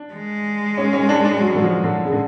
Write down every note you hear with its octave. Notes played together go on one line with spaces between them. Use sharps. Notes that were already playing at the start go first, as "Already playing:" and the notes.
Already playing: D4
G#3
C#4
C#4
D4
D4
F#3
D3
F3
D3
C#3
D3